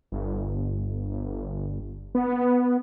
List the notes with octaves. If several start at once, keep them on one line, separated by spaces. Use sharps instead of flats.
G1
B3